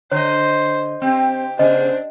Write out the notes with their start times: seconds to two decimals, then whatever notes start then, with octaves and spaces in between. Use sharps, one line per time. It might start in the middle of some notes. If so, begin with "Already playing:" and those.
0.12 D3 C5 C#5 D#5
1.02 C4 G4
1.59 C#3 B3 D4 G#4 C5 D#5